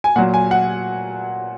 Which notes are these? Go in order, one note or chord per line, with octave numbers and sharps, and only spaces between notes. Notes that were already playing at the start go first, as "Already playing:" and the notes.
G#5
A#2 F#3 F#5
G#5
F#5